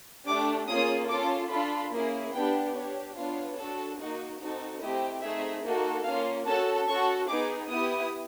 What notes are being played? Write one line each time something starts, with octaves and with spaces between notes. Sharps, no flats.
A3 D4 G4 D6
A#3 C#4 F4 G#4 D#6
C#4 F4 A4 D6
D4 F4 A4 B5
A#3 C#4 E4 G#4
B3 D4 G4 G5
D4 G4 C#5
B3 D4 F4 C#5
D4 F#4 A4
A#3 D#4 F#4
C4 D#4 F#4 A4
A3 C4 E4 G4 D#5
A3 C4 D#4 G#4 E5
A#3 D#4 F#4 A4
A#3 C#4 F4 F5
C#4 F#4 A4 A5
C#4 F#4 A4 C#6
B3 D#4 G#4 D6
B3 E4 G4 D#6